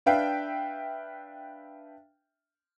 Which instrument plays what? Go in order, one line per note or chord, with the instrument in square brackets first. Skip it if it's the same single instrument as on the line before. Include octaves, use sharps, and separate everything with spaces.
[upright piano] D4 B4 E5 F5 G5